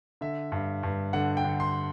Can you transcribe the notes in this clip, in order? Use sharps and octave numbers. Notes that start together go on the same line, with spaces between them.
D3 E5
G2
G2
D3 F#5
G5
D3
C6